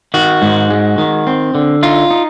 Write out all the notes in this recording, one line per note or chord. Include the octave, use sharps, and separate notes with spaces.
D#3 F#4
G#2
G#3
D#3
C4
D3
D#4 F4
D#4